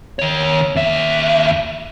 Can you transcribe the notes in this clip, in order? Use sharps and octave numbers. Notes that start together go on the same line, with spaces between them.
D#3 C#5
D#2 E5